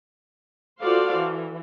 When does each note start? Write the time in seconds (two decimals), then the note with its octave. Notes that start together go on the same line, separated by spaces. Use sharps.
0.81 F4 F#4 A4 C5 D5 F5
1.15 E3